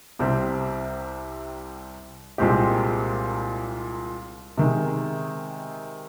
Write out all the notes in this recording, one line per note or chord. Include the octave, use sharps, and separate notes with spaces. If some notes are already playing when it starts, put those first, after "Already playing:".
C2 C3 G3 C4
C2 A#2 G#3 C4 G4
C3 D#3 G#3